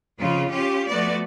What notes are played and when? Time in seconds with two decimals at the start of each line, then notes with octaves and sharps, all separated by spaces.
0.19 F2 C#3 F4
0.51 C#4 F4 G4
0.89 F3 A3 B3 F#4 D5